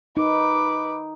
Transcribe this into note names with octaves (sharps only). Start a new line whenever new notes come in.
D#4 B4 D6